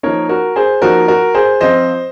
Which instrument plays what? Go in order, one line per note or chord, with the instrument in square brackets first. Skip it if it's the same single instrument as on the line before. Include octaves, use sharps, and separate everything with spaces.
[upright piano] F3 A#3 D#4 A#4 C#5
F#4 A#4
G#4 C5
F3 A#3 D#4 F#4 A#4
F#4 A#4
G#4 C5
F3 C4 F4 C5 D#5